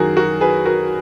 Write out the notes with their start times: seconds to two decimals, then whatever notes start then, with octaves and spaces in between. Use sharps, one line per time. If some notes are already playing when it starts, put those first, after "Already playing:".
Already playing: F#2 D#3 F#4 G#4 A#4
0.16 F#4 A#4
0.41 G#4 B4
0.65 F#4 A#4